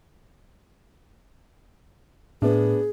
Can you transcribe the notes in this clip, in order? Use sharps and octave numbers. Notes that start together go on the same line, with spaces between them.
A2 B3 D4 G#4